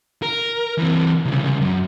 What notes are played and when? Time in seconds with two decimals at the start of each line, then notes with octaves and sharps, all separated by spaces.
0.23 A#4
0.78 E3 C4
1.25 C2 C#3
1.61 F#2